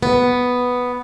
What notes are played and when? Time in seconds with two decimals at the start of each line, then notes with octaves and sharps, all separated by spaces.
0.03 B3